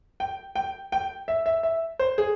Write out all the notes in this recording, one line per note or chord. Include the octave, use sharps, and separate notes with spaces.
G5
G5
G5
E5
E5
E5
C5
G#4